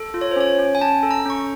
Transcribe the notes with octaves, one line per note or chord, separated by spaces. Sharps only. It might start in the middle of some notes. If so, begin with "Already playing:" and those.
Already playing: A4
F4
C#5
C5
C#4 C#5
C#4
G#5
C#4 A5
A4
A#5
C#4 C#6